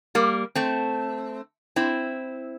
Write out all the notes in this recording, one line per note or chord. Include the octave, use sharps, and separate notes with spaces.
G3 A#3
A3 C4
C4 E4